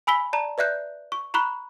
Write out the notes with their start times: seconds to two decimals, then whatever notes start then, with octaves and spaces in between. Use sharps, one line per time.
0.07 G#5 B5 E6 B6 G7
0.33 D5 A5 A#5
0.58 B4 D5 E5 F#6 G6
1.12 C#6
1.34 A#5 B5 C#6 F#6